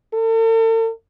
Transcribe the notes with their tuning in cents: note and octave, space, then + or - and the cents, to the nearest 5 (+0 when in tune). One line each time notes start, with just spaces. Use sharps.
A4 +45